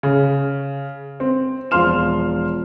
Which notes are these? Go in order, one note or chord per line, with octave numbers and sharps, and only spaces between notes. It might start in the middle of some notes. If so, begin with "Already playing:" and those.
C#3
C4
E1 F3 F5 C6 F6 E7